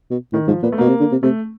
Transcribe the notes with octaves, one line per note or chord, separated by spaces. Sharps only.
B2
A2 D#3
G#2 F3
A#2 B3
A3
B2 A#3
C3
D3
C3
C3 A3